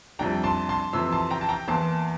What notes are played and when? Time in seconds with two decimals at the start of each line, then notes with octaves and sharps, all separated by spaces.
0.19 F2 C3 G3 D4 G5 A#5
0.44 A5 C6
0.69 A5 C6
0.93 F2 C3 E3 C6 E6
1.12 A5 C6
1.30 G5 A#5
1.41 A5
1.49 G5 A#5
1.67 E2 E3 A#3 A5 C6